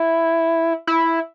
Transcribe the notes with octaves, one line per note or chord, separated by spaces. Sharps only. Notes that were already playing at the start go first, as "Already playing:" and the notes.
Already playing: E4
E4